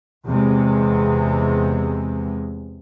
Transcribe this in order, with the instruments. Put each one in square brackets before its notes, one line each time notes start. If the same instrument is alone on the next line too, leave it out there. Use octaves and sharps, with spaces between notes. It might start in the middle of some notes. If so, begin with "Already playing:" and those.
[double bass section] E2 C3 G#3